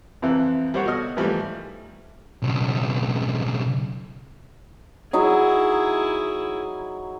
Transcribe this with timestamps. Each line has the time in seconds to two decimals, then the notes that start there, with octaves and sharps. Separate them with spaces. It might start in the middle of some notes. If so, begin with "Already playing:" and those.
0.22 F2 C3 E3
0.74 G3 A#3 C5 C#5 F#5
0.85 B2 F#4 A4 D#5 F6
1.17 G#2 E3 F3 G3 A3
2.42 B1 C#3
5.13 F#3 D#4 E4 G#4